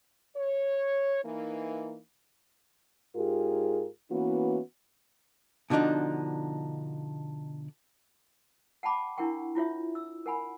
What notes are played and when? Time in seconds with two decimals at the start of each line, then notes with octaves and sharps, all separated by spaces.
0.36 C#5
1.23 E3 A#3 D#4
3.16 G#2 F4 G4 G#4 A#4
4.11 E3 A#3 B3 C#4 E4 F#4
5.70 B2 D3 F3 D4 D#4
8.83 F#5 G5 A5 B5 D6
9.17 D4 E4 A#4 F#5 G5 C#6
9.55 E4 F4 C#5 E5
9.95 E6
10.26 A#4 F#5 G#5 B5